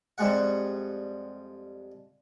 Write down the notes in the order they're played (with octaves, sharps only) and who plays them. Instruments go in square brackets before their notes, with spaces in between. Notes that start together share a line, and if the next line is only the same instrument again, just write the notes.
[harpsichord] F2 G3 G#3 F#5